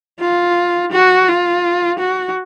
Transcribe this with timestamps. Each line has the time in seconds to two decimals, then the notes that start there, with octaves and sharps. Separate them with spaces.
0.20 F4
0.92 F#4
1.28 F4
1.99 F#4